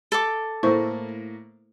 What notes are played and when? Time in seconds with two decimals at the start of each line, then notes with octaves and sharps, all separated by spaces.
0.12 A4 D6
0.63 A2 A3 A#3 E4 C5 C#6